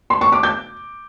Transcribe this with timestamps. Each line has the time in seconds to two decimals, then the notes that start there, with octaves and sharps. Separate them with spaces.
0.10 C6
0.21 C#6
0.32 D6
0.43 G6